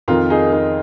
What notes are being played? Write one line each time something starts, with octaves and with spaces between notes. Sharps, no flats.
F2 D#3 F4 A#4
D#4 G#4
D#4 G#4